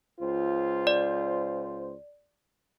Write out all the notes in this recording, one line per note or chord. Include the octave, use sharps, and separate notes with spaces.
C#2 F4 C5
D5